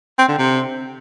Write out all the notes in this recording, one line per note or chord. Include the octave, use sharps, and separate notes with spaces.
C4
D3
C3